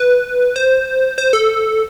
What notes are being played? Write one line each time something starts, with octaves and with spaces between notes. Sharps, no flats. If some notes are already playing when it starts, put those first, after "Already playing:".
Already playing: B4
C5
C5
A4